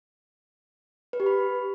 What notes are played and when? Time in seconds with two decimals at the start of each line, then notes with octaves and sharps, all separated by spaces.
1.13 B4
1.20 G4
1.26 B5